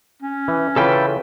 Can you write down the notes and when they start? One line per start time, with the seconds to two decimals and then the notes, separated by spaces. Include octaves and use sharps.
0.22 C#4
0.48 E3
0.76 C#3 E3 F4 A4 B4 G5